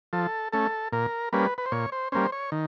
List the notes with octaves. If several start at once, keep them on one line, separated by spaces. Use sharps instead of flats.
F3 A4
A3 C#4 A4
A#2 A#4
G3 A#3 C#4 B4
B4
C5
A#2 C#5
C5
G3 A#3 C#4 C5
C#5
D#3